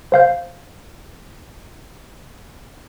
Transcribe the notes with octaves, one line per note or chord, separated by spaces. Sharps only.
C5 F5 G6